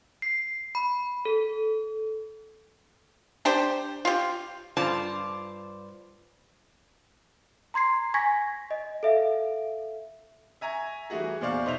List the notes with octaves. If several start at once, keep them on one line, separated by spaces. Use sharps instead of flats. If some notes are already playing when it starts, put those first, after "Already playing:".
C7
B5
A4
D4 G4 C5
F4 G4
G2 F4 C5 D5 A5
A#5 C6 G#6 C7
G#5 C#6 G#6 A#6 B6
D#5
A4 E5 F5
E5 G#5 A#5 C#6 G#6
E3 G3 A3 F#4 G#4
E2 A#2 C5 D5 F5 C#6
B1 D#4 C5 E5 F7